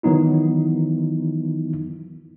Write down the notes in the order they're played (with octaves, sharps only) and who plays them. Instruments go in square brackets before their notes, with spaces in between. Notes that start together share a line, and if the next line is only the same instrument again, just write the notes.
[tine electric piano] D#3 E3 F#3 B3 D#4 E4